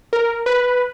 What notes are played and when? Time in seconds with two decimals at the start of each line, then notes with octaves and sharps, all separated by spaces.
0.13 A#4
0.46 B4